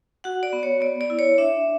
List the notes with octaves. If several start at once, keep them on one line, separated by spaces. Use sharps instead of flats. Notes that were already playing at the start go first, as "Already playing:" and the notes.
F#4 F#5
D5
B3
C#5
B3 D5
D5
E4
C#5
D4 E5